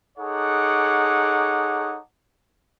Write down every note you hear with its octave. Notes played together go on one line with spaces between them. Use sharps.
D#4 G#4 A4 C#5 F#5 D6